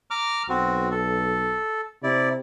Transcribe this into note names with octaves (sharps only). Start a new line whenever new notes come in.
A#5 D6 F6
B1 C4 F#4
A4
C3 E4 D5